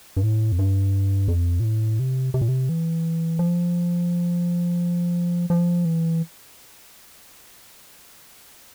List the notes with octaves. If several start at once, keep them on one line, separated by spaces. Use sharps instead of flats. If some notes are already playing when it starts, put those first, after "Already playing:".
G2
A2
F2
G2
F2
A#2
A2
C3
C3
A#2
C3
E3
F3
F3
E3